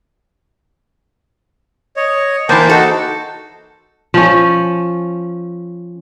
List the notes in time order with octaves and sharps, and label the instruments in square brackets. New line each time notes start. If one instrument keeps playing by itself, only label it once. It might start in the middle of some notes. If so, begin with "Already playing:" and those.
[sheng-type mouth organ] C#5 D#5
[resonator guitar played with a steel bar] E3 A#3 [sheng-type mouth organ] C5 G5 A5
[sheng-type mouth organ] D#4 F#4 [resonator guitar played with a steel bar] A4
[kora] F3 C#4